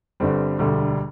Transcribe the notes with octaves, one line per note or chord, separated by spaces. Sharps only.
G1 G2 D3 G3 C4
E1 D2 D3 G3